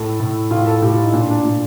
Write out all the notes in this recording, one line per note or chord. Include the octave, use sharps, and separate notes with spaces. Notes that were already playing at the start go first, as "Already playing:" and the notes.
Already playing: A2 A4
A2
A2 F4
A4
A2 G4
F4
D#4
A#2 D4
D4
A#2